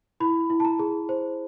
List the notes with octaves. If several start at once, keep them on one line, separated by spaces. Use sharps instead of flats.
E4 B5
E4
A5
A#5
G#4
C5